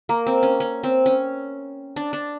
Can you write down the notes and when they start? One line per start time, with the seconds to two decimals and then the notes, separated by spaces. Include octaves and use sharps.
0.09 A#3
0.27 C4
0.43 C#4
0.60 C#4
0.84 C4
1.06 C#4
1.96 D4
2.13 D4